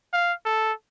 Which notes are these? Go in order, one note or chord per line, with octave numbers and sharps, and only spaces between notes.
F5
A4